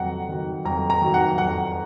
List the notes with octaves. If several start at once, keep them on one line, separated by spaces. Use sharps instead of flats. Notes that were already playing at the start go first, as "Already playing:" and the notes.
Already playing: F2 D#3 F#3 F#5 A#5
D#3 F#3
F2 A#5
A#5
D#3 F#3
F#5
F2 F#5